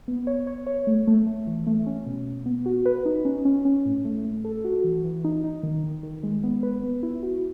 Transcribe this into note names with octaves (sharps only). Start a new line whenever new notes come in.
B3
C#5
C#5
C#5
A3
A3
A3
E3
A3
C#4
B2
B2
B3
F#4
B4
D#4
C#4
C#4
C#4
A2
A3
A3
A4
F#4
E3
E3
D#4
D#4
D#3
D#3
D#3
G#3
B3
B4
B3
E4
F#4